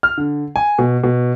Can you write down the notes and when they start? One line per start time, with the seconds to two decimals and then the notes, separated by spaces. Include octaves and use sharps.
0.03 F6
0.17 D3
0.56 G#5
0.79 B2
1.04 B2